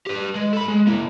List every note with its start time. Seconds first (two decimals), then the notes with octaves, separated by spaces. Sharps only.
0.07 G4 B4
0.36 G#3
0.53 A4 B5
0.68 G#3
0.87 A#3 E4